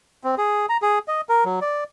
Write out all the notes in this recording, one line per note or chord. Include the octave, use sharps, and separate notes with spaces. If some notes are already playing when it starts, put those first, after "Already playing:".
C4
G#4
A#5
G#4
D#5
A#4
F#3
D5